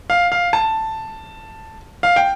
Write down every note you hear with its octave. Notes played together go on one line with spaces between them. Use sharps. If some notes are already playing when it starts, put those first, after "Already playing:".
F5
F5
A5
F5
G5